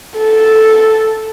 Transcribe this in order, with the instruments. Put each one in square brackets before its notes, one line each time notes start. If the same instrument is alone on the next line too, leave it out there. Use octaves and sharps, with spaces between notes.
[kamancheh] A4